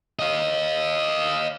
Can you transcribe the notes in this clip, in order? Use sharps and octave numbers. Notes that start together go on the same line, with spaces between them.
D#5 F5